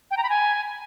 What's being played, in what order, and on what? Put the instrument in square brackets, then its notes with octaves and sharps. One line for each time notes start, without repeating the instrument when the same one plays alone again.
[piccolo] G5
A#5
B5
G#5